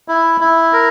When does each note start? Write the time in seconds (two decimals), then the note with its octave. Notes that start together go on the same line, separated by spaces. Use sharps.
0.08 E4
0.41 E4
0.73 A#4